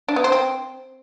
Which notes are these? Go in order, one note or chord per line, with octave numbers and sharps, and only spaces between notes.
D4
B3
C5
C4